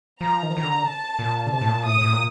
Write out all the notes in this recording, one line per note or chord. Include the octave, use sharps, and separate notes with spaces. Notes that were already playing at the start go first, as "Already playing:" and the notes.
F3 A#5
D#3
F3
D#3 A#5
D3
A5
A#2
D3
C3 A5
A2
A#2
A2 D#6
A2
A#2